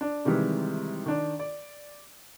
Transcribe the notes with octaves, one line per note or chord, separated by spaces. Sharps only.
D4
C3 D#3 E3 G3 G#3
D#3 D4
D5